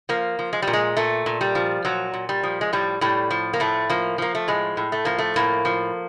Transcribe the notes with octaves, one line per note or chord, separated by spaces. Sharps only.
F3 A#3
F3
G#3
A#2 G3
G#3
A#2 A3
A#2
G3
F3
A#2 F#3
A#2
G3
F3
G#3
A2 G3
A2 G3
F3
A#3
A2 A3
F3 A#3
F3 A#3
A3
A2 G#3
A2
A3
F3 A#3
A3
A2 A#3
F3